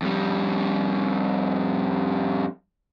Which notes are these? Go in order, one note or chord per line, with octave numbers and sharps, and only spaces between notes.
F2 G3